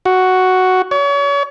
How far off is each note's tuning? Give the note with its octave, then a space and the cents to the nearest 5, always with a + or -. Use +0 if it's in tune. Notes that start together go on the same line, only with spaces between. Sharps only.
F#4 +5
C#5 +35